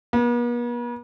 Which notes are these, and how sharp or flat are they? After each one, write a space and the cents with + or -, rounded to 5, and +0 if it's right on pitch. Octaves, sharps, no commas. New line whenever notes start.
B3 -45